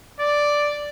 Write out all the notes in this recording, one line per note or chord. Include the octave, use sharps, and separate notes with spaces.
D5